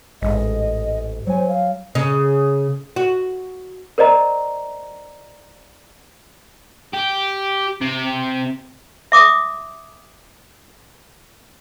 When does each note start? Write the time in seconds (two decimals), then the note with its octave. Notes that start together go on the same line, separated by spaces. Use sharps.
0.22 A1 G#2 D#5
1.27 F#3 C5 G#5
1.48 F5
1.95 C#3
2.96 F#4
3.98 A#4 C5 D5 D#5 A#5
6.93 G4
7.81 C3
9.12 E5 D6 D#6